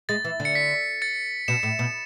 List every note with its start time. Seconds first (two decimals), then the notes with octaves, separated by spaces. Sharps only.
0.09 G#3 A6
0.24 E3
0.40 D3
0.45 C#7
0.55 B6
1.02 A6 C#7
1.48 B2 C#7 E7
1.63 A2
1.79 B2